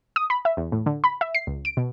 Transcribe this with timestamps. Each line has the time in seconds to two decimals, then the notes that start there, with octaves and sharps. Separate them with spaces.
0.16 D#6
0.30 B5
0.45 E5
0.57 E2
0.72 A2
0.86 D3
1.04 B5
1.21 E5
1.35 C7
1.47 C#2
1.65 D7
1.77 B2